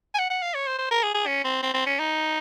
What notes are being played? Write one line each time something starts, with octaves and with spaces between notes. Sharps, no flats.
G#5
F#5
F#5
F5
C#5
C5
C5
A#4
G#4
G#4
C#4
C4
C4
C4
C#4
D#4